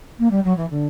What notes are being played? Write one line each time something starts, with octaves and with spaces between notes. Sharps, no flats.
A#3
G3
F#3
E3
D3